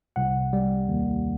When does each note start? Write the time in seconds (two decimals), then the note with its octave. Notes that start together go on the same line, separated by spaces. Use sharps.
0.16 C2 F#5
0.53 G3
0.88 D#2